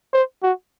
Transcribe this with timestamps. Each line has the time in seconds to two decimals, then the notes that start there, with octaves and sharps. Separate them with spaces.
0.13 C5
0.43 F#4